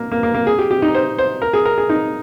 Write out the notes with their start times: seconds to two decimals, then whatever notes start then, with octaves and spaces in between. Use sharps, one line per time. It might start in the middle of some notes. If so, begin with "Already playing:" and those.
Already playing: A#3
0.12 A#3
0.23 A#3
0.34 A#3
0.47 G#4
0.59 G4
0.71 G4
0.82 D#4
0.95 C5
1.18 C5
1.42 A#4
1.53 G#4
1.65 A#4
1.78 G#4
1.89 D#4